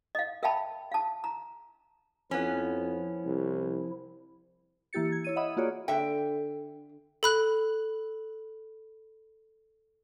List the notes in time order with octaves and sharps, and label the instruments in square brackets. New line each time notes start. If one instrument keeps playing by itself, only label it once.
[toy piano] D#5 F5
A#4 E5 F5 G5 A5 B5
F5 A5
A#5
[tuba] F2 [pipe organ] F3 E4 [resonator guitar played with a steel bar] B3 C#4
[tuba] C2
[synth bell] E3 A#3 E4 G4 A6 C#7
G#6
E4 C#5 D#7
D#5 E5 F#5 B5 D#6
A#3 F4 F#4 G#4 C#5 D5
[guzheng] D3 [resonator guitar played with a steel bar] E5 G5
[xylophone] A4 B5 F#6